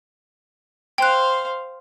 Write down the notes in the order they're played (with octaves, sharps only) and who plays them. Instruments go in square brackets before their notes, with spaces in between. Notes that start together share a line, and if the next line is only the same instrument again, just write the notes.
[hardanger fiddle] C5 F5 [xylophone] G5 F#6